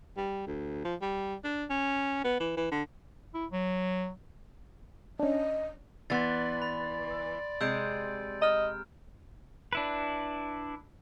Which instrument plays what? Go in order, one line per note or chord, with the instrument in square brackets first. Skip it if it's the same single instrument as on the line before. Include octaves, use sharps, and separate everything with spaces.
[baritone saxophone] G3
D2
F3
G3
D4
C#4
B3
E3
E3
D3
[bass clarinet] E4
F#3
[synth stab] C#4 D4 [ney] D#5
[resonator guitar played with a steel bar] E3 B3 [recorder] D5 [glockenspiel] C6 A6
[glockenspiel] B5
[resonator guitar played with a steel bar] C3 G#3 [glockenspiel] E6 G6 D7
[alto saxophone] D#5 [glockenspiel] A#5 F6
[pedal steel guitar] D4 E4 B4